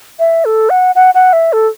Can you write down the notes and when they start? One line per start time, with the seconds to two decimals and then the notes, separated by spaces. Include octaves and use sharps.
0.19 E5
0.45 A4
0.70 F#5
0.95 F#5
1.15 F#5
1.33 E5
1.53 A4